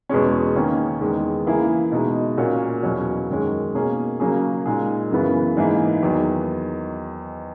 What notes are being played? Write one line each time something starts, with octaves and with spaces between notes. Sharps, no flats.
E2 B2 G#3 C#4
D#3 A#3 C#4
E2 D#3 G#3
C#3 E3 A#3 E4 G#4
B2 G#3 D#4
A#2 A#3 C#4 F#4
E2 B2 F#3 C#4 F#4
F#2 D#3 G#3 C#4
B2 A#3 C#4 G#4
C#3 F#3 A#3 C#4 G#4
A#2 G#3 D#4 G#4
F#2 C#3 E3 B3
G#2 E3 A#3 E4 G#4
E2 D#3 F#3